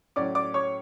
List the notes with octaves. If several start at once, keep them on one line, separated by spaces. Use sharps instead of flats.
A2 F#3 C#4 D5 D6
D5 D6
C#5 C#6